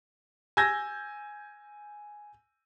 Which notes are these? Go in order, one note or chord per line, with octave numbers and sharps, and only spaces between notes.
G#5 E6 G6 G#6 A#6